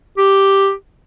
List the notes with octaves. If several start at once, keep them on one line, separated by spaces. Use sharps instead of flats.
G4